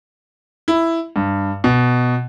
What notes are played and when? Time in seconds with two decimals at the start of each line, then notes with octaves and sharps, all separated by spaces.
0.68 E4
1.16 G2
1.64 B2